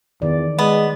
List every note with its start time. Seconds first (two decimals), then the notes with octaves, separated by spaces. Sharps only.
0.22 E2 D#3 D5
0.59 G#3 B3